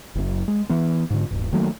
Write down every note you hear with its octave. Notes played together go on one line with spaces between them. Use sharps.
F#1 F#2
G#3
E3 B3
G#2 D3
D1 B1 G2
D#3 F#3 A3 A#3